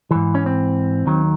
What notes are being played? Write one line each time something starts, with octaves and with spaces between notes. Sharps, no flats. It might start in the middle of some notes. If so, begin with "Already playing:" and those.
G#2 E3
C#4
C4
D#2 D#3 F#3